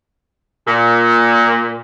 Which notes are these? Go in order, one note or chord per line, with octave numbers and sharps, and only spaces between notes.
A#2